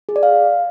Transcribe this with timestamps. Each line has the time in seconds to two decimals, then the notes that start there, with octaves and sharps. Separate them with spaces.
0.09 G#4
0.16 D5
0.23 F5